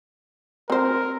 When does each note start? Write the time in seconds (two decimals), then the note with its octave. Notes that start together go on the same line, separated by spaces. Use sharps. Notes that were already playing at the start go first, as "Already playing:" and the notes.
0.70 C4 A#4 C5